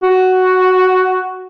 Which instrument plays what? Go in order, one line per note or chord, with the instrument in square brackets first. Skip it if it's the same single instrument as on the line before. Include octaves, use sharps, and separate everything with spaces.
[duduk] F#4